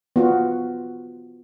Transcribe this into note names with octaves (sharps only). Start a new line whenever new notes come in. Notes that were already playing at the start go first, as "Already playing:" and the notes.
B3 F4 F#4